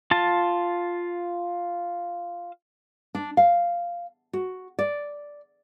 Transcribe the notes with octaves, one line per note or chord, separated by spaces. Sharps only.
F4 A5
D4
F5
F#4
D5